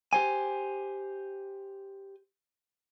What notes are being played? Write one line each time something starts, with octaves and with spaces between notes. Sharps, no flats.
G4 C5 G#5